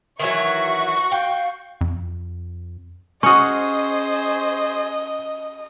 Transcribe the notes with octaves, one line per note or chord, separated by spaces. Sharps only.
D#3 E3 F#3 F#4 E5 C#6
F5 G5
F2
C#4 F#4 G#4 C5 D#5 C#6 D#6